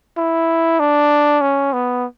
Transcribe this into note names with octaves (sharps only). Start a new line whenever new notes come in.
E4
D4
C#4
B3